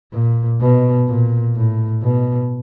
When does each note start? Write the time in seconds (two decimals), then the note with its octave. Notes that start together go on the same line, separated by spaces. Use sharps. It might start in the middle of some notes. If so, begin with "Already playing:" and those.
0.13 A#2
0.60 B2
1.08 A#2
1.55 A2
2.03 B2